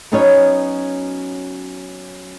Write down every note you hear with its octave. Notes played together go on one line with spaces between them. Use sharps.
F#3 B3 C#4 D#4 F#4 C#5